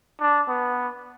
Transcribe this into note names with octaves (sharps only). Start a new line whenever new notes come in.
D4
B3